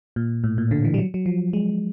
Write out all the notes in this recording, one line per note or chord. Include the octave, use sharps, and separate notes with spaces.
A#2
A2
A#2
D3
E3
G3
F#3
F#3
F3
G#3